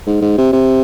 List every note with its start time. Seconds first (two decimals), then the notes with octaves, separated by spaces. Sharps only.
0.07 G#2
0.22 G#2
0.38 C3
0.53 C3